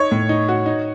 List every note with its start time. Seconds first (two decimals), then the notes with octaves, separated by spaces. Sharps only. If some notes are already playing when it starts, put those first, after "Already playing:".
Already playing: D#4 C#5
0.11 A2
0.29 D#4
0.49 F#4
0.66 D#4